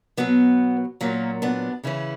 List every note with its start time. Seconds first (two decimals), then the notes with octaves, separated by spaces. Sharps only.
0.17 B2 F#3 B3
1.01 A#2 F#3 A#3 C#4
1.42 B3 D4
1.84 C#3 E3 C#4 E4